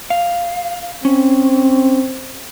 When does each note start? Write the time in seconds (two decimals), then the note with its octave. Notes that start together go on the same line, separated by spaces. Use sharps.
0.10 F5
1.05 C4 C#4